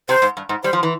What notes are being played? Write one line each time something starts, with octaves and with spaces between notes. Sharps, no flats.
C3 C5
G#2
G2
G#2
G3 C5
F3
E3